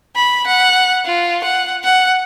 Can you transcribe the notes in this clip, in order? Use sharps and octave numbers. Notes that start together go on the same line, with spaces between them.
B5
F#5
F4
F#5
F#5